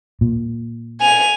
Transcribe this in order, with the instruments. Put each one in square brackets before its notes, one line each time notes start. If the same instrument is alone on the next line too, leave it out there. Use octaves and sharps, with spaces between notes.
[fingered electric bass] A#2
[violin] G#5 F7